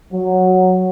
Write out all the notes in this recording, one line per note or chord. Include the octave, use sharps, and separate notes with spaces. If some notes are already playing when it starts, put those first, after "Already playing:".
F#3